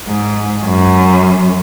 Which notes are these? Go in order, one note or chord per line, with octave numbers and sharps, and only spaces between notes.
G#2
F#2